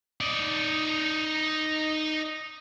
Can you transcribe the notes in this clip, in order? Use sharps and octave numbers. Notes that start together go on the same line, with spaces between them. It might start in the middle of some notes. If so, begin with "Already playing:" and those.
D#4 D5